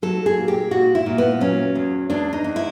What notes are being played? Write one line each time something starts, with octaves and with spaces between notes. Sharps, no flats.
F#3 A4
G#4
A#2
G4
A#2 F#4
E4
A#2
B3
F#3 C#4
E2
E2 D4
D#4
E2
E4